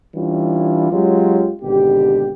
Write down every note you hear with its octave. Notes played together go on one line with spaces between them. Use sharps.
E3 G3 C#4 D4 F4
F#3 G#3 C#4 F4 G4
G#1 B2 D3 G4